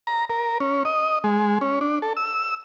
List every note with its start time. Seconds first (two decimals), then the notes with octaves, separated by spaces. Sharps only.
0.07 A#5
0.30 A#4
0.60 C#4
0.85 D#5
1.24 G#3
1.61 C#4
1.81 D4
2.02 A4
2.17 E6